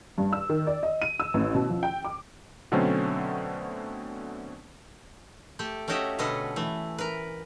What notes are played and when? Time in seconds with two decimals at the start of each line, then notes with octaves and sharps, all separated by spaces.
0.18 G2
0.33 E6
0.49 D#3
0.67 D5
0.83 D#5
1.02 D#7
1.20 E6
1.34 A1
1.54 B2
1.70 F3
1.83 G5
2.05 D6
2.72 B2 D3 F#3 A3 C4 C#4
5.59 A3 G4 A4 G5
5.88 A3 C#4 F#4 G4 D#5 E5
6.18 B2 D3 C#4 A4 B4 D#5
6.56 E3 A3
6.98 A#4 B4